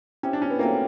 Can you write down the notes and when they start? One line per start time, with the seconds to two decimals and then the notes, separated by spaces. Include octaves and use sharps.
0.23 C4 C#4 E4 G4
0.33 D4
0.42 C#4
0.50 B3
0.59 F#3 A3 A#3 C4 F4